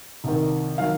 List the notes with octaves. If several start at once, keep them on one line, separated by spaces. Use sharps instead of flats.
C2 C3 D#3
D#3 F#3 F5